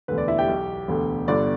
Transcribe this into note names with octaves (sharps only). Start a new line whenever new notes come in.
E1 D2 D3 B4
D5
E4 E5
G4 G5
B1 B2
E1 D2 D3
G1 G2 D3 D5